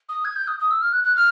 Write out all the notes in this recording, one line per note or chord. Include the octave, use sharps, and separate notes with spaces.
D#6
G#6
G6
D#6
D#6
E6
F6
F#6
F#6
F6